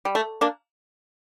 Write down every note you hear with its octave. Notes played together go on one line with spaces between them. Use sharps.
G3
A3
A#3 D4